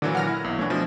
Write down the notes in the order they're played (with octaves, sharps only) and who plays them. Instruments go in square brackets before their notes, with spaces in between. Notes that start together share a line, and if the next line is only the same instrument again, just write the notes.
[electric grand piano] A#2 E3 F#3 [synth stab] D3
[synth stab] F#5 F6 A#6
[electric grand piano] E4
B1
[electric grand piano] E3 C#5 [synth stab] A3 D4
[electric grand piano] B2 F3